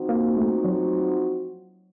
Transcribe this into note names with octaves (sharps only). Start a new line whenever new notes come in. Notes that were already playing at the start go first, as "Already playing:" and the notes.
Already playing: F3 C4 D#4 F#4
A#3
A3
F#3